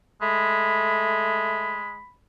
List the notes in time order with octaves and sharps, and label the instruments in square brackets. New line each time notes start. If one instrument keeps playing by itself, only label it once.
[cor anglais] G#3 [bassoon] A3 [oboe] B5